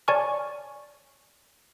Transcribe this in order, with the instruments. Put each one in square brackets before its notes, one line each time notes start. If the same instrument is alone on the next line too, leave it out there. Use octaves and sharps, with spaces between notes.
[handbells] C#5 D5 G#5 A5 C#6 F6